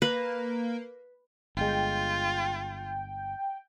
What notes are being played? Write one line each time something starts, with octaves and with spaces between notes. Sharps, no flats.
A#3 B4
G1 G#3 F4 G5